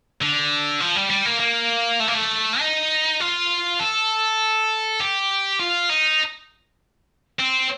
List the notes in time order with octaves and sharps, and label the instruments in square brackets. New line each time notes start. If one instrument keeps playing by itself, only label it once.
[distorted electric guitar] D3
F3
G3
G3
A#3
A#3
A3
A#3
A3
D#4
F4
A4
G4
F4
D#4
C4